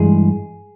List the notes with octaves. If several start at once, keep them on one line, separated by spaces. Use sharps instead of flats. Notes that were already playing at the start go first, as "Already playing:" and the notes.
Already playing: G2 E3 G#3 G#4